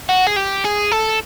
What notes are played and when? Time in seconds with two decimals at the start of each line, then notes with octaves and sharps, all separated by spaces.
0.09 F#4
0.27 G#4
0.36 G4
0.64 G#4
0.92 A4